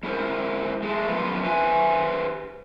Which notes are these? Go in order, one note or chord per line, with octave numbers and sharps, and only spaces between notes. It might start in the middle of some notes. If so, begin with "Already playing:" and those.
G#3 E4 A#4 C5
G#3 A3
F#2 F3 B3 F4 B4
G4 B4 C5 E5 G#5